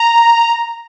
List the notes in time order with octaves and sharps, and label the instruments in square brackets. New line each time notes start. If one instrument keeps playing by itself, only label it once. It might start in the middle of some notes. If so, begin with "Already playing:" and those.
Already playing: [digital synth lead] A#5